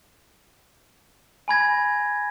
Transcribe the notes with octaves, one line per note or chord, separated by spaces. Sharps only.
G#5 B5 G#6 A#6